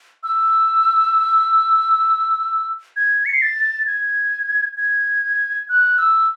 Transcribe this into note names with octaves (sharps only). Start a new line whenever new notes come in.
E6
G#6
C#7
C7
A6
G#6
G#6
F#6
E6